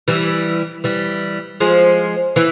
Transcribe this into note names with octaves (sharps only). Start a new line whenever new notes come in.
E3 G3
E3 G3
F3 G#3
E3